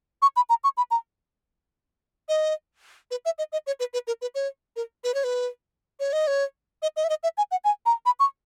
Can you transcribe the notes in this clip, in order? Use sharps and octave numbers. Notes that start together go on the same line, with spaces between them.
C#6
B5
A#5
C#6
B5
A#5
D#5
B4
E5
D#5
D#5
C#5
B4
B4
A#4
B4
C#5
A#4
B4
C#5
B4
C#5
D#5
C#5
D#5
D#5
E5
D#5
E5
G#5
F#5
G#5
A#5
B5
C#6